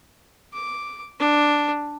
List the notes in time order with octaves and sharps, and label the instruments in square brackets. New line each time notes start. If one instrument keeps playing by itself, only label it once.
[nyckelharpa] D6
D4